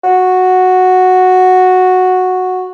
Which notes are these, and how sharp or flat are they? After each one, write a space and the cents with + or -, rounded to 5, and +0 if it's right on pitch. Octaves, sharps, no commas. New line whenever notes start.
F#4 -5